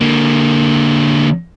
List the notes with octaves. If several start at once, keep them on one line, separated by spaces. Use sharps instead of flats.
D3 A#3